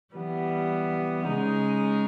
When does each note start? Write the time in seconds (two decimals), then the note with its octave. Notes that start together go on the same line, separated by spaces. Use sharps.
0.15 E3 G3 B3
1.27 C#3 G#3 D#4 G#4